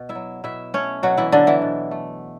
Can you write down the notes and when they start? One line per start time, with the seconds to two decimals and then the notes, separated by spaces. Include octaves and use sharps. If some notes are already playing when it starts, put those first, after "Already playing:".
Already playing: B2
0.09 E4 E5
0.15 F#3
0.44 B2 E4 E5
0.74 A3 C#4 C#5
1.03 B2 F#3 F#4
1.17 E3 E4
1.32 D3 F#3 D4
1.47 E3 E4
1.62 B2
1.91 A3